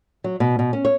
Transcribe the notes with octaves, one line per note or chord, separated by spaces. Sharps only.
F#3
B2
B2
C#4
C#5